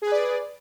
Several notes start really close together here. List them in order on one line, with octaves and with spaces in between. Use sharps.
G#4 B4 D5